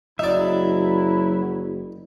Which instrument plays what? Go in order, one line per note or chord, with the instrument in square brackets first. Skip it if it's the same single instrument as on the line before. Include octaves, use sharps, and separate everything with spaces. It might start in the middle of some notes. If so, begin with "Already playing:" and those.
[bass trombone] F#1 [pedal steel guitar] F#3 E5 [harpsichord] D#4 D5 [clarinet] E4